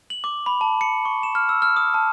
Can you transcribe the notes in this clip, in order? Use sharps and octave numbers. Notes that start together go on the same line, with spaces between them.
F#7
D6
B5
A5
C#7
C#6
E7
F6
E6
F6
D#6
A5